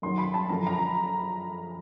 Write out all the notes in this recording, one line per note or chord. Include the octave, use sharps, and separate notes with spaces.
F#2 D#3 F#3 C6
B5
A5
F#2 D3 F3 A#5
A#5
B5